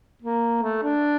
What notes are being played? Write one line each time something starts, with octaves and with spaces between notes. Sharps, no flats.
A#3
A3
D4